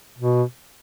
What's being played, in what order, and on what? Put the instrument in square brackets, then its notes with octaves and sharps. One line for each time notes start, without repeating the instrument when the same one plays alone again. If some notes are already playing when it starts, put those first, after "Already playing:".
[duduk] B2